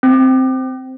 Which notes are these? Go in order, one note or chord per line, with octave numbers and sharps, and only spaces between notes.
C4